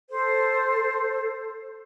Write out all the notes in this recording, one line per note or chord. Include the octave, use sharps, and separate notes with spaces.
A4 C5